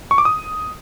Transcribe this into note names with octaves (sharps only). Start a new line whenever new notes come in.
C#6
D6
D#6